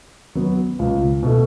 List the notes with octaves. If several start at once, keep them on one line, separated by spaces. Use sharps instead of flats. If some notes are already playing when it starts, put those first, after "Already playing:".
F#3 B3
C#2
B2 A3